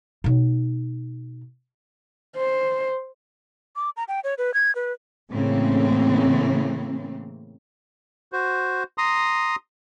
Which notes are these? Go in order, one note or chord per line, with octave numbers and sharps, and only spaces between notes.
B2 D#4
C5
D6
A#5
G5
C#5
B4
G#6
B4
A2 C#3 E3 A#3 C4
F#4 C5
A#5 C6 D#6